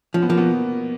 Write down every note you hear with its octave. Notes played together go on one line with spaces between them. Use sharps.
F3 C#4
B3
F3 A#3
B2 B3